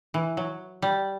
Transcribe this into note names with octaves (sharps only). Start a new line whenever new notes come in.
E3
F#3
G3